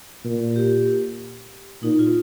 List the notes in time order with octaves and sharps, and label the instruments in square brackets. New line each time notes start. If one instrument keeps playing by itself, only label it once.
[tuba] A#2
[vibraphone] G4
[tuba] A#2 [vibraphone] D#4
[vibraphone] F4